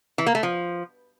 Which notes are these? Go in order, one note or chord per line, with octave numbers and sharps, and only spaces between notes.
E3
A#3
A3
F3